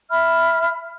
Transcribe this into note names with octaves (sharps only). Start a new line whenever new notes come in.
E5 B5 F6